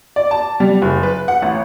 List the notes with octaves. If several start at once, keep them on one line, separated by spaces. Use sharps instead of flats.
D5
A5
G3
F#1
B4
F#5
A1